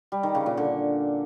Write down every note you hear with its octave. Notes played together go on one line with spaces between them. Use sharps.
G3
D#3
C#3
A#2
D3